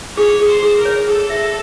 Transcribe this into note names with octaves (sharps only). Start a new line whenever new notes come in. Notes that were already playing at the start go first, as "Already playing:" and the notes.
G#4 C#5
G#4
C5
G#4
A#4
C#5
G#4 A4
E5